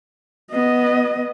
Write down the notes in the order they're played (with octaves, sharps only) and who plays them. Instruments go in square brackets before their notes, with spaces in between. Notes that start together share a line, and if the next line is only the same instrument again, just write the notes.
[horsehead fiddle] B3 D#5